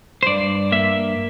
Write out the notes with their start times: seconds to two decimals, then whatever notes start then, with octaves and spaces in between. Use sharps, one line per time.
0.23 C5
0.26 G2 D5
0.72 A#3 E5